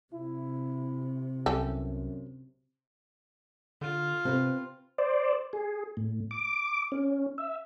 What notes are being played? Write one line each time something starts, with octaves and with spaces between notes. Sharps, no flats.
C3 E4
C2 F#2 E3 G4 A4
D3 F4
C3 C4 B4
C5 D5
G#4
A2
D6
C#4
E5